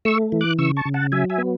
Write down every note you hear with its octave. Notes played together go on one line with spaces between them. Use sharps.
A3 C#6 E6
E3
D6 F#6
C#3 C#6 E6
A5 C#6
C#3
F#5 A5
F#3 E5 G#5
E5 G#5
B3